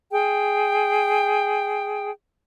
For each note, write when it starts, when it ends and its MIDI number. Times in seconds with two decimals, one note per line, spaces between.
0.11 2.10 68
0.11 2.10 79